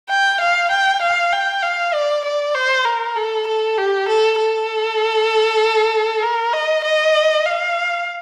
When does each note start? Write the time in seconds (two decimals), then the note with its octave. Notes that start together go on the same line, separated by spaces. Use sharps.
0.10 G5
0.41 F5
0.71 G5
1.02 F5
1.33 G5
1.62 F5
1.94 D5
2.25 D5
2.55 C5
2.85 A#4
3.16 A4
3.47 A4
3.78 G4
4.09 A4
4.38 A4
6.22 A#4
6.53 D#5
6.84 D#5
7.46 F5